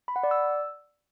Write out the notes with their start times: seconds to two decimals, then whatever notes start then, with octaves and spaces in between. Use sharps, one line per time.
0.08 B5
0.16 F#5
0.23 D5
0.31 E6